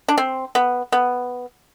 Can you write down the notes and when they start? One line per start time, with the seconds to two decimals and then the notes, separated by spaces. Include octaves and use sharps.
0.08 D4
0.18 C4
0.55 B3
0.92 B3